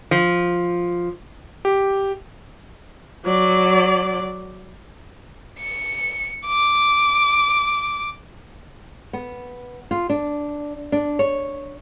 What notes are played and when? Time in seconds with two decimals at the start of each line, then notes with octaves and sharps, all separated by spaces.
0.11 F3
1.65 G4
3.25 F#3 D5
5.59 C#7
6.47 D6
9.13 B3
9.91 F4
10.10 D4
10.92 D4
11.19 C#5